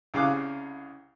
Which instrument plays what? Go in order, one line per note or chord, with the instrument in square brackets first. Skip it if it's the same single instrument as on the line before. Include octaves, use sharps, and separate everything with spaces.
[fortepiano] C2 C#3 F5 D6 F#6